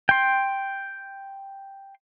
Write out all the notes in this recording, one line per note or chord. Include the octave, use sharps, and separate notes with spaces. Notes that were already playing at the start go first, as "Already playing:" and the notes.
G5 C6